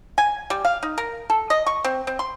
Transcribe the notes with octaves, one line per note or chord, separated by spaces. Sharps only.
G#5
G3
F5
D#4
A#4
A4
D#5
C#6
C4
C4
C6